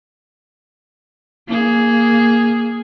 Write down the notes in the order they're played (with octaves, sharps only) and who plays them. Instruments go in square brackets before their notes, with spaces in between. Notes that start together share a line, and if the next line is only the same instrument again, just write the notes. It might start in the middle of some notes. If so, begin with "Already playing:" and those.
[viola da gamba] A#3 G#4